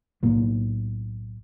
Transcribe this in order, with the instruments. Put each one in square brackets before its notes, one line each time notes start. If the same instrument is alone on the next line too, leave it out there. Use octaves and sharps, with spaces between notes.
[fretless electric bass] B1 A2 A#3 B3